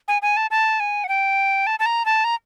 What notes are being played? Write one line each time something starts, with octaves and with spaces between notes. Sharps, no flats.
G#5
G#5
A5
A5
G#5
F#5
G5
A5
A5
A#5
A5
A#5